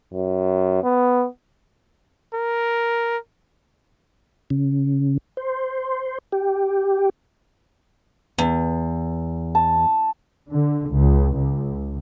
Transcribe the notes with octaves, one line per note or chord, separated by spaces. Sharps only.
F#2
B3
A#4
C#3
C5
G4
E2 B3
A5
D3
C#2
C#2